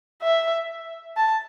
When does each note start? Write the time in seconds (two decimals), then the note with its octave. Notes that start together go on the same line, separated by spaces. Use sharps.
0.22 E5
1.17 A5